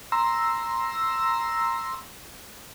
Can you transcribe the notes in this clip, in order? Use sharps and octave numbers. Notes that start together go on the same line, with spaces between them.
A#5 C6 E6